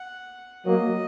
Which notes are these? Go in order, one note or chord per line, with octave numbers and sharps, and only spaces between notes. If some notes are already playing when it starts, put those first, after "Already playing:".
Already playing: F#5
F#3 A#3 D#5